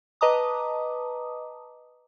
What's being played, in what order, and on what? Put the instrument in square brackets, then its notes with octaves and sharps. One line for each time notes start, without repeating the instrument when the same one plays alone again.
[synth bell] B4 D#5 A5 A#5 D6 D#6